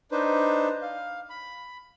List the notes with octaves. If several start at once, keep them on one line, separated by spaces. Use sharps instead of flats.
D4 D#4 B4 C5
F5
B5